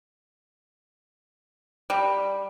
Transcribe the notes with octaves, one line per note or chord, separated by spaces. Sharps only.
G3